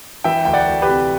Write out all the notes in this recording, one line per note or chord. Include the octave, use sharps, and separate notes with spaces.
E3 E5 G5
D2 G5
D5 F#5
D2
G4 B4
C3